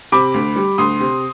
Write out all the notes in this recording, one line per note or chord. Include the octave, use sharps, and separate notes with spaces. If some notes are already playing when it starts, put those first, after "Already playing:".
C3 B5 D6
D2
G3
D2 C6 D#6
C3